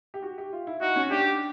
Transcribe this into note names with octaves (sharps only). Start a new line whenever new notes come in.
G4
F#4
G4
F4
E4
D#4 F#4
C#4
D4 G4